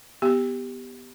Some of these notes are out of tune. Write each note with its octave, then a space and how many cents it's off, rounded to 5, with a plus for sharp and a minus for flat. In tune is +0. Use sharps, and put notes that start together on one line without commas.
B3 +0 G4 +0